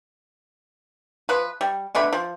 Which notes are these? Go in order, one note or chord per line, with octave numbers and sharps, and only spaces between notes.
F3 B4
G3
B2 D3 A3 B5
F3